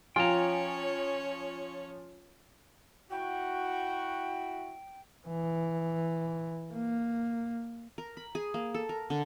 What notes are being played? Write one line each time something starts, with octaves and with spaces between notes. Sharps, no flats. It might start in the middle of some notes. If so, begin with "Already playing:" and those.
F3 C#4 F4 C#5 G5 G#5 A#5
E4 F#4 G5
E3
A#3
A#4
B5
G#4
A#3
A4
A#4
D3